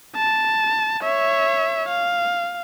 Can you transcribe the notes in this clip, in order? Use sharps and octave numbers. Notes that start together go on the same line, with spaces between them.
A5
C#5 E5
F5